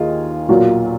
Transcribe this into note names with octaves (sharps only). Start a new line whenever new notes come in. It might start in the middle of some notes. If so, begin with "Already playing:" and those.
Already playing: D#2 F4 G#4 D#5
B1 A#2 F#3 F4